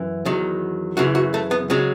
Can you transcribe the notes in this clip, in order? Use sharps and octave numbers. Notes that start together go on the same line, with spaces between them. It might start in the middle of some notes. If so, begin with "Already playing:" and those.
Already playing: F#2 E3
E2 D#3 F#3
F#2 C#3 E3 F#4
F#4
A3
B3
C#3 F#3 G#3